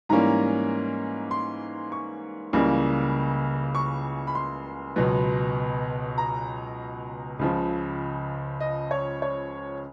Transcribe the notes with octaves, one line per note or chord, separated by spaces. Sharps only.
G#2 E3 G3 A#3 C#4 A#5
C6
C#6
C#2 C#3 E3 G3 A#3
C#6
B5
C6
C#2 B2 F#3 B3
A#5
C#2 C#3 F3
D#5
C#5
C#5